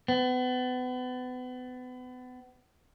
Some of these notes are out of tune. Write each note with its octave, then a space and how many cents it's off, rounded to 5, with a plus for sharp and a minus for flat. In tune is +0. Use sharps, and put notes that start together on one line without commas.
B3 +35